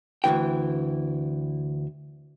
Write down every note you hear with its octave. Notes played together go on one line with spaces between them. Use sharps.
D2 C#3 E3 G5